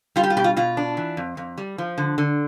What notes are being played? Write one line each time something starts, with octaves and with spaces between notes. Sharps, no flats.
G3 F4
G4
F4
B2 G4
F4
B2 F4
D4
E3
F2
F2
G3
F3
D3
D3